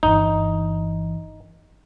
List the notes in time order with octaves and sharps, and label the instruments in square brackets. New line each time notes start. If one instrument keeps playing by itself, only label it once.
[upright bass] G1 E3 [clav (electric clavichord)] D#4